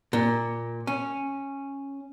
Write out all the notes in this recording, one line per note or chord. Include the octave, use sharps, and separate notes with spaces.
A#2
C#4